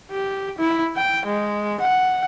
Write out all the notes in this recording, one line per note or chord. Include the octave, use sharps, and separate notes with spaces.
G4
E4
G5
G#3
F#5